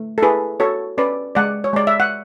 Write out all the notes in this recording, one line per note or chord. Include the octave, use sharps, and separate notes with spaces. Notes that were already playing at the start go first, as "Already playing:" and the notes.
Already playing: A3
A4
E4 G#4 B4
F#4 A4 C#5
C#4 B4 D5
G#3 D5 F#5
C#5
G#3 D5
E5
F#5